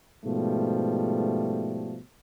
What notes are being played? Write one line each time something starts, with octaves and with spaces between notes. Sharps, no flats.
G#2 B2 F3 G3 A3